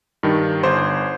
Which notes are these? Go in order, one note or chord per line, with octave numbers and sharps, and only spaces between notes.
G2 D#3
G1 C5